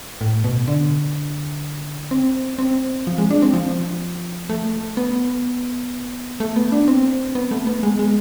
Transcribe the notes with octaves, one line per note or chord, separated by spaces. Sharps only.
A2
B2
D3
C4
C4
F3
G#3
D4
C4
F3
A3
B3
A3
B3
D4
C4
B3
A3
B3
G#3
G#3